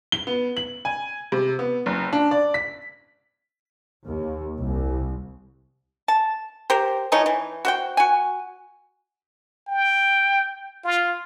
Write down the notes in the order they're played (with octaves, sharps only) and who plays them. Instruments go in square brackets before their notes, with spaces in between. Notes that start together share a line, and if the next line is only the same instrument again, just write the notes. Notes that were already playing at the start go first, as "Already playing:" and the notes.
[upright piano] G7
B3
F#7
G#5
C3
B3
F#1
D4
D5
B6
[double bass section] D#2
C2
[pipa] A5
G4 A#4 C5
E3 F3 D#4 C#5
E3
F#4 C5 G5
F#4 G#5
[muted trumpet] G5
F4